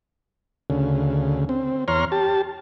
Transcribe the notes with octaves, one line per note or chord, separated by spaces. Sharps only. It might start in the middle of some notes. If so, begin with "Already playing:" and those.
D2 C#3
C4
E2 C#5 A#5 C6 F6
G4 A5